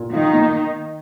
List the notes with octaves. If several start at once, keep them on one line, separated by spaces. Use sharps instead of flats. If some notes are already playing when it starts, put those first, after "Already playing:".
Already playing: A#2
D#3 D#4 F4
A#3